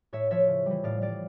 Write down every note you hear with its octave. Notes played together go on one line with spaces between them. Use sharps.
A2 C#5 E5
F3 C#5 E5
C#3
E3 G3
A2 D5 F5
G3 D5 F5